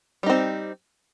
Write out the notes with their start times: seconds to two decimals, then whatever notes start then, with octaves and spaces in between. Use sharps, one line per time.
0.23 G3
0.26 D#4
0.30 C4